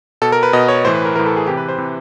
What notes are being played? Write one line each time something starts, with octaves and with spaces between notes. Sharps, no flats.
B2 A4
A#4
B4
B2 D#5
C#5
A2 E3 C5
B4
A#4
A2 E3 A#4
A4
G#4
C3 E3 G4
B4
C5
C3 E3